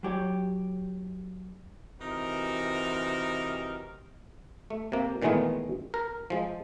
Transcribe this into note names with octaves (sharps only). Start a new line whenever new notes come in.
F#3 G4 C#5
C3 E3 D#4 F#4 A#4
A3
C3 A#3
A#2 D#3 E3 G#3 A3 B3
A#4
F3 G#3